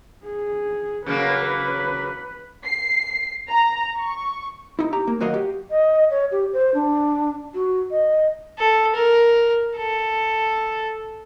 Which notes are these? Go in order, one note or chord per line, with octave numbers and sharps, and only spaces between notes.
G#4
C#3 F#3 A#3 B4
C7
A#5
C#6
D#4 E4
G4 A#5
A#3
D#2 F#3 F#4 A#4 D#5 F5
G4
D#5
C#5
G4
C5
D4
F#4
D#5
A4
A#4
A4